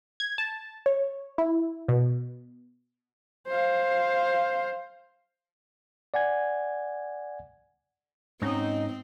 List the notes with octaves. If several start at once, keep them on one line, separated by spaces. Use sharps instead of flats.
G#6
A5
C#5
E4
B2
C5 F5
D5 F#5 G#5 G#6
G#2 C4 C#4 D#4